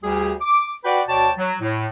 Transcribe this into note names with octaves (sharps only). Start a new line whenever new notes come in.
D2 G3 G4 G#4
D6
F#4 B4 D5 G5
D2 B2 C#5 D5 G5 A5
F#3
A2